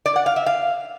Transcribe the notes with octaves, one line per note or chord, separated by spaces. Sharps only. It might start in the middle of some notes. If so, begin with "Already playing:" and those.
D5
F#5
F5
E5
F5